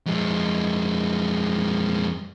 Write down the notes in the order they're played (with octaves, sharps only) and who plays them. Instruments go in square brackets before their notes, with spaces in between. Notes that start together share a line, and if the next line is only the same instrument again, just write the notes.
[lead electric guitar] F2 G#3